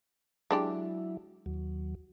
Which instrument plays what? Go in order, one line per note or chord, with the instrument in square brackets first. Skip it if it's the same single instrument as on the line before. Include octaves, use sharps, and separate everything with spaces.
[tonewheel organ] F#3 E4 [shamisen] G#3 D4 G4
[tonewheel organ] D#2 F#3